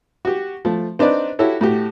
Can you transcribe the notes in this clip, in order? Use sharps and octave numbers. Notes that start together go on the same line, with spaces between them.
F#4 G4
F3 A3
C4 D4 D#4 B4 D5
E4 F#4 G4 A4 C#5
A2 A3 F#4 G4